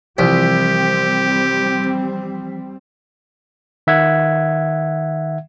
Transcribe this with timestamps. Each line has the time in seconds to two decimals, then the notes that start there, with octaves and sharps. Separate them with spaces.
0.18 C2 E3 F3 G3 C4 G4 B6
3.87 D#3 E5 F#5 G#6